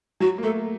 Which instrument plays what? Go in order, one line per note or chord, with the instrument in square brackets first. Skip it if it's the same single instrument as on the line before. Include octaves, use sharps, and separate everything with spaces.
[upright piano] F#3 [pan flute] F#4
[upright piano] A#3
[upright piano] A3 [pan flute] A4